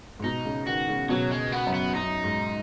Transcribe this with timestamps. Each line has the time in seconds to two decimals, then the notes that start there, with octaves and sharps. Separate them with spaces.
0.19 G#2
0.24 B2 D#4
0.45 C#3
0.67 D#3 F#4
0.89 C#3
1.09 B2 F#3
1.31 G#3
1.52 B3
1.67 F#2
1.74 B3
1.95 F#2 D#4
2.24 G#2